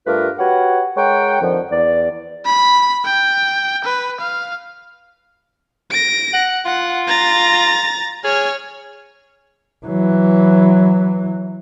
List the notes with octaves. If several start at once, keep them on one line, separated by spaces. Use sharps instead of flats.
G2 A3 F4 G4 A#4 B4
F#4 G4 B4 C#5 F#5
G#3 A#4 C#5 F#5 G5
F2 D3 D#3 F3
E2 D5
B5
G5
B4
F5
A#6 D7
F#5
F4 F#5
A#5 A6
G#4 C#5 F6
E3 F#3